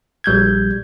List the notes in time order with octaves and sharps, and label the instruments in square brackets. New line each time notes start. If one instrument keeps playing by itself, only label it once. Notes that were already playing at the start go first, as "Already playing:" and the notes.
[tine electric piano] A#1 G3 G6 G#6